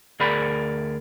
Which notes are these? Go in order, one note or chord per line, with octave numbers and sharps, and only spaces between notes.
D2 G#4 A#4 D5 B5